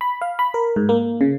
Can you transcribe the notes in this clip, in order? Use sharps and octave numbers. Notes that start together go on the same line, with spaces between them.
B5
F5
B5
A#4
G#2
A#3
C#3